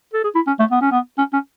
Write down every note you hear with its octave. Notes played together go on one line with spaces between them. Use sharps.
A4
G#4
E4
C#4
A3
B3
C#4
B3
C#4
C#4